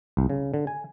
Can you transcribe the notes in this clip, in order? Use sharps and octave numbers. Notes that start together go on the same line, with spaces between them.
C2
C#3
D3
G#5